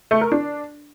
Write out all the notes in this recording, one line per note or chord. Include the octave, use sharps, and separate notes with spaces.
A3
A#4
D4